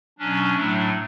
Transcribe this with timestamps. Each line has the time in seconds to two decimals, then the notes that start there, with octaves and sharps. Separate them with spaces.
0.18 B2 F#3 C#4 D4
0.55 A2 F#3 A3